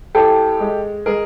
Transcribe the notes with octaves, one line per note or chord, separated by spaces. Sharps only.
A2 G4 A4
G#3
G#3 G#4 A#4